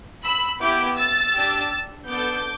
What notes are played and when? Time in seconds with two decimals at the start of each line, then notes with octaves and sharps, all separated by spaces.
0.24 B5 E6
0.61 B3 E4 G4 D6 G6
0.98 E6 A6
1.34 D4 G4
2.08 B3 D4 A4 D6 G6